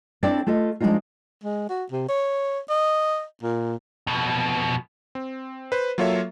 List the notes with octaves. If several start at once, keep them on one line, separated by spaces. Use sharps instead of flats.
C4 D4 E4 A4 C#5 D5
A3 F4 A4 D#5
F3 G#3 A#3 D4 D#4 F4
G#3
F#4
C3
C#5
D#5
A#2
F2 B2
C4
B4 C5
F#3 A#3 F4 A4 C#5 E5